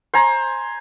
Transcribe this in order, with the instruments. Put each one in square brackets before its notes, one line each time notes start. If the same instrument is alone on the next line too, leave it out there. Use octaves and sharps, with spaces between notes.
[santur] C5 G#5 A#5